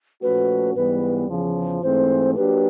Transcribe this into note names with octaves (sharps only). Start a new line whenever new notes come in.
A#2 F3 A3 C#4 F#4 B4
G#2 E3 G3 B3 B4
E2 C#3 F3
G#2 E3 A3 C4 C5
F#3 A#3 D4 G4 B4